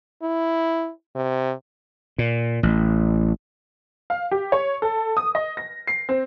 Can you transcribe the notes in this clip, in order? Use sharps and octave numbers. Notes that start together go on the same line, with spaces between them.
E4
C3
A#2
A1
F5
G4
C#5
A4
D#6
D#5
A#6
C7
C4